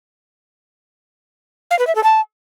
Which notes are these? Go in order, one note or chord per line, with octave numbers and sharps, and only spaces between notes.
F5
B4
E5
A4
A5